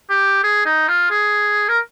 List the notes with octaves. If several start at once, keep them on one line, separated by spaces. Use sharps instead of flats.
G4
G#4
D#4
F4
G#4
A#4